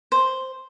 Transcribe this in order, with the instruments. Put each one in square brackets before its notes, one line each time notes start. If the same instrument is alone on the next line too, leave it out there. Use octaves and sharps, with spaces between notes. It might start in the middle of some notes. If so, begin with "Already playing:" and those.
[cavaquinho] C5